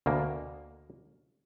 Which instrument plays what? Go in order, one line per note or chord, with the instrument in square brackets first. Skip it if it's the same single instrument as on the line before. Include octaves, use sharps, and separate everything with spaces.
[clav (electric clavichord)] D2 B2 A#3